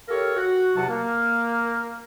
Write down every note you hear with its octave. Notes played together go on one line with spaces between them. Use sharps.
G4 A4 A#4 C#5 F5
F#4
E2 C3 F#3 F#5 A5
A#3